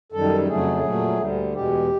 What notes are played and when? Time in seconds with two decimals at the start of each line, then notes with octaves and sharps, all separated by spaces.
0.12 F#2 D#3 G3 A4
0.47 F2 C#3 F#3 A3 G#4
0.83 A#2 F#3 A3
1.18 D2 D3 G3
1.54 E2 B2 G#3 G4